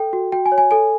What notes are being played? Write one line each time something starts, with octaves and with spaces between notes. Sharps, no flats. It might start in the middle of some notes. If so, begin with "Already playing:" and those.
Already playing: A4 G5
F#4
F#4 G5
G#5
C#5
G#5
A4 G#5